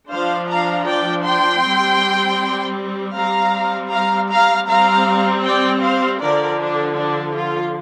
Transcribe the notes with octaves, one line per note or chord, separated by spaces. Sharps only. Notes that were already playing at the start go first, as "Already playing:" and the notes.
F3 D4 C5 F5
F5 A#5
D5 G5
G5 C6
G3 C4
G3 C4 F5 A#5
F5 A#5
F5 A#5
G3 C4 F5 A#5
D5 G5
C5 F5
D3 F3 D4 A#4 D5
D4
D4
F4